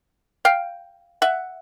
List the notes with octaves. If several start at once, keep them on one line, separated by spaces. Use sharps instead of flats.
F5 G5
E5 F#5